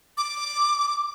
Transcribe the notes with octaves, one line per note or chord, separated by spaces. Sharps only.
D6